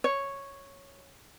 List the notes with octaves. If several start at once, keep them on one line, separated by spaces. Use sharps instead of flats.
C#5